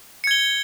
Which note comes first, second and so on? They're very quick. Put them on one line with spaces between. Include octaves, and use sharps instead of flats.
C#7 G#6 G7